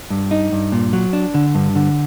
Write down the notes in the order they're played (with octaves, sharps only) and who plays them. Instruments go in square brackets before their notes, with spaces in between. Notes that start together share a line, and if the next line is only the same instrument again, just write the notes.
[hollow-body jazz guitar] G2
D#4
G2
A#2
F#3
D4
D3
G2
D3